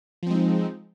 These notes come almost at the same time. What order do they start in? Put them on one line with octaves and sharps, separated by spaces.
F3 C4 G#3 D#4